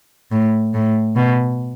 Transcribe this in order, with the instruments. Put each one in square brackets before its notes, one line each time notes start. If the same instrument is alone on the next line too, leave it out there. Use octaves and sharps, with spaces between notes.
[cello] A2
A2
B2